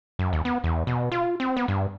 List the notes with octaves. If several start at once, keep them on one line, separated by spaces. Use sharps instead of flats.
F#2
D#2
B3
E2
B2
F4
C4
B3
G2